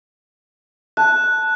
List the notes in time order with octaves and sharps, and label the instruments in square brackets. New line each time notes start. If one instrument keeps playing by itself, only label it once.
[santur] A5 [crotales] F#6